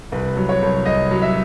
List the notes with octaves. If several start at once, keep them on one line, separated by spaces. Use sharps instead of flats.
C2 B4
F#3
C#5
C2
C2 D#5
F#3
E5